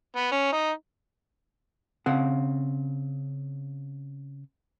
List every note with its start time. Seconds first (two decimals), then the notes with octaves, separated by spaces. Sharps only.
0.16 B3
0.31 C#4
0.53 D#4
2.06 C#3 C4 F#5